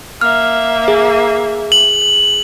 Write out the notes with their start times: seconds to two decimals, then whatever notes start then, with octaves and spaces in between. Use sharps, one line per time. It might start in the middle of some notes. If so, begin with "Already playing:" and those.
0.21 A#3 E5 F6
0.88 G#4
1.72 F#7